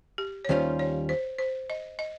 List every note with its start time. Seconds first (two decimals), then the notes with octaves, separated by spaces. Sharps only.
0.18 G4
0.45 C#5
0.49 D#2 D#3 G3 C#4 F4 C5
0.79 C#5
1.09 C5
1.39 C5
1.70 D#5
1.99 D#5